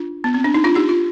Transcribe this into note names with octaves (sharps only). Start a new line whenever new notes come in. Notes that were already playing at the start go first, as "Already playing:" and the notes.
Already playing: D4 F4
B3
C4
D4
D#4
D4 F4
D#4 G4
F4